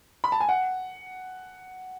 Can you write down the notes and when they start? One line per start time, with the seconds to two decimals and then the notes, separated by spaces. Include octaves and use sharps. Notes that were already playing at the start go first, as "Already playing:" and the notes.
0.24 B5
0.32 A5
0.40 G#5
0.49 F#5